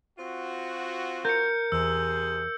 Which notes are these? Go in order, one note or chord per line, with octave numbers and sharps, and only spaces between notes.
C4 F4 F#4
A#4 G6 C#7
E2 C3 G#4 E6